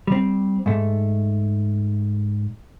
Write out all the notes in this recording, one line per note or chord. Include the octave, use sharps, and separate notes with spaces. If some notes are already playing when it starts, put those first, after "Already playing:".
G3 C4
G#2 A3